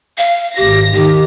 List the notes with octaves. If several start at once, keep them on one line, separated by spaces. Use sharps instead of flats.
F5
G#1 G4 A#6
D#3 G4